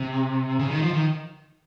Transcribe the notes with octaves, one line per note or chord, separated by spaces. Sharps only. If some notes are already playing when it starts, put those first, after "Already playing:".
Already playing: C3
C#3
D#3
F3
D#3